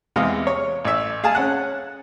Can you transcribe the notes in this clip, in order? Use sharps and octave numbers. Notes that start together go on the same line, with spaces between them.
E2 C3 G#3 D#5 F5
C#5
A1 E5
G#4 F5 G#5 A5
C#4 F#5 F#6